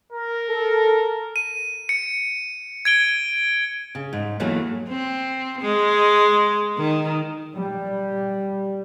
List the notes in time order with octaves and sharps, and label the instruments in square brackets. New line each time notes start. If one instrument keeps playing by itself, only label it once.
[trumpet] A#4
[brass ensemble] A4
[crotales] D#7
C#7
G#6 D7 G7
[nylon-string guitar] C#3
G#2
E2 E3 F#3 A3 A#3
[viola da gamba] C4
G#3
D#3
[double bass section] G3